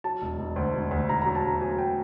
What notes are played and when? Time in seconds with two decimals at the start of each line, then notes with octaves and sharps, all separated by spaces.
0.04 F#3 A5
0.22 E1
0.39 E1
0.56 D2
0.74 E1
0.91 D2
1.09 E1 A#5
1.22 A#5
1.26 F#3
1.35 A5
1.44 E1 A#5
1.61 F#3 G#5
1.78 G5